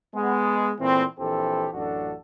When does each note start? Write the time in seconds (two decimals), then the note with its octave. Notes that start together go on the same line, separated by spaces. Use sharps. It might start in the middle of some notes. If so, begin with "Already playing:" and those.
0.14 G#3 B3
0.80 A#2 E3 A3 C4
1.19 A#1 E3 C4 G4 A4
1.73 A1 F#2 D4 F#4 A4